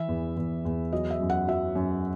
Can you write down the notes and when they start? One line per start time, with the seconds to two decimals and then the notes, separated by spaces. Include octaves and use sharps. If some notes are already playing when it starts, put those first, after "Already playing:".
Already playing: E3 E5
0.08 E2
0.37 E2
0.65 E2
0.92 F#3 D#5
1.11 E5
1.21 F#2
1.30 F#5
1.48 F#3 E5
1.75 F#2